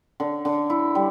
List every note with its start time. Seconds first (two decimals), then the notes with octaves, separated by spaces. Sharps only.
0.20 D3
0.45 D3
0.70 E4
0.95 G3